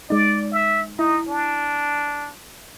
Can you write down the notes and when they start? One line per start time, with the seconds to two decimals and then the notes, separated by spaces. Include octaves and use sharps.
0.10 G#3 D#4 D5
0.52 E5
0.99 D#4 E4
1.29 D4